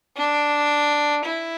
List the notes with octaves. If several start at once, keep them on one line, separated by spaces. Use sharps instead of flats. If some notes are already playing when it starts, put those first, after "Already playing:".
D4
E4